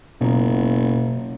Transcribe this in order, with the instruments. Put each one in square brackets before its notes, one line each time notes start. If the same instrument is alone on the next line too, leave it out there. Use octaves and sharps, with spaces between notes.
[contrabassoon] F#1 [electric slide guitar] B2 F4 A#5